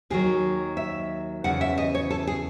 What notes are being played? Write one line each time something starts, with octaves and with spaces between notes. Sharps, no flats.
D#2 D#3 F#3 G#4
E5
E2 C#3 F#5
E5
D#5
C#5
A4
G#4